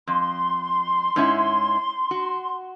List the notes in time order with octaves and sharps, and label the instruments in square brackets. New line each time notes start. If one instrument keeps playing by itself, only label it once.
[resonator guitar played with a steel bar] F2 [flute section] C6
[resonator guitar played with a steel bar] G#2 C#4 E4
F#4